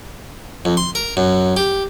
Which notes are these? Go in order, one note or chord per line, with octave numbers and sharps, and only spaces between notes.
F2
C6
A#4
F#2
G4